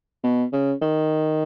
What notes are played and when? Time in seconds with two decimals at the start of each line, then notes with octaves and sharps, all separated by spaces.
0.24 B2
0.52 C#3
0.82 D#3